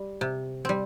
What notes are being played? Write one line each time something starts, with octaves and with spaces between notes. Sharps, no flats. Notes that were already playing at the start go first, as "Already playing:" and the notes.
Already playing: G3
C3
G3 C4